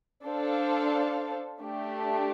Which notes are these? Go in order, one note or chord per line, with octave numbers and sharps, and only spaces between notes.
D4 A4 C5 F5
A3 D4 G4